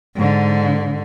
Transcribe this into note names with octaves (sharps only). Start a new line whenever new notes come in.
G#2 D3